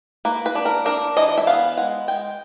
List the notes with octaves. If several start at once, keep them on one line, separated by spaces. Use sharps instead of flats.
A#3 B4
B4
D4
A#4
D4 A#4
E3 D#5
D#5
E5
B3 F5
G#3 F#5
G#3 G5